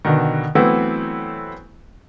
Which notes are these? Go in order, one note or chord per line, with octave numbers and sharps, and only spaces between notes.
B2 D3 D#3
E3 F#3 A3 B3 C4 E4